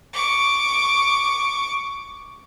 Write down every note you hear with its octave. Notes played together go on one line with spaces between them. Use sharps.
C#6 D6